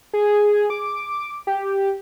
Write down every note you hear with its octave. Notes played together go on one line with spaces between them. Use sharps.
G#4
D6
G4